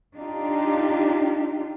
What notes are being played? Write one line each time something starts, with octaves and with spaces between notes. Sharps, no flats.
D4 D#4 F4 G4